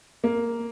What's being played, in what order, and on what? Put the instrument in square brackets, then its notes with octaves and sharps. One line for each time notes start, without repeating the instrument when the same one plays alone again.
[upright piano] A#3